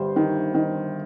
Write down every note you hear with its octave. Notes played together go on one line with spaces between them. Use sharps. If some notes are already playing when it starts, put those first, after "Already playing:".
Already playing: G1 G3 C5
D#3
D#3